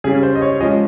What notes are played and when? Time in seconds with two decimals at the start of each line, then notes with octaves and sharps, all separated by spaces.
0.04 C#3 G3 C#4 G#4
0.23 C5
0.35 D#5
0.42 C#5
0.60 F3 G#3 C#4 D#5